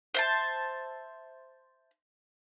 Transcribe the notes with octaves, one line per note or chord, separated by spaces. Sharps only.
C5 E5 A5